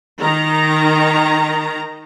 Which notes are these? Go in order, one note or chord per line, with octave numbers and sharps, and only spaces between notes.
D#3 A#5